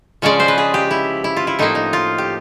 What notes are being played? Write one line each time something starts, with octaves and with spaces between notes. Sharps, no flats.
C#3 F3 G#3 C#4 D5
C5
B4
G#4
G4
E4
E4
F4
E4
A2 F3 A#3 D#4
D#4
F4
G4